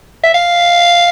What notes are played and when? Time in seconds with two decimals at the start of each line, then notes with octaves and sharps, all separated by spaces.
0.23 E5
0.34 F5